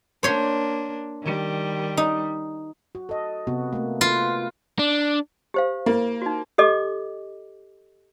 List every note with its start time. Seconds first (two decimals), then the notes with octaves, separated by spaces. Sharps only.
0.23 A#3 D4 C5 C#5 C6
1.23 D#3 G3
1.97 D#4
2.95 F#4
3.09 A4 D#5
3.47 C3 B3 F#4
3.73 A3 A#3
4.01 F4 B4
4.79 D4
5.54 G4 C5 F5
5.86 A#3 E4
6.22 D#4 F#4
6.58 G4 A4 D#5 D6